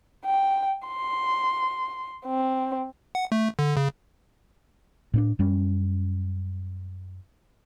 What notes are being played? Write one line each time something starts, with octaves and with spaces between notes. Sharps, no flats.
G5
C6
C4
F#5
A3
D3
C#3
A2 C4 D4
F#2 G3 C#4